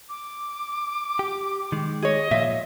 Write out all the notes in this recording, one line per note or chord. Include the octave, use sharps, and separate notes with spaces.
D6
G4
D#3 G#3
G#4 C#5 D#5
A#2 F3 E5 F5